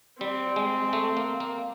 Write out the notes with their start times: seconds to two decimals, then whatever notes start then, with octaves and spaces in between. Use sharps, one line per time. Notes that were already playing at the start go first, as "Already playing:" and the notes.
0.21 G3 C4
0.56 G#3
0.93 A3
1.17 A#3
1.40 A#3